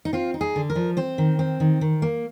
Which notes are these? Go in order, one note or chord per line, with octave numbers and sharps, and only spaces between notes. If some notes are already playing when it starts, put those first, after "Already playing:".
D#4
C4 F4
D#4
G#4
D3
A#4
F3
C4 C5
D#3
C4
D#3
D#3
A#3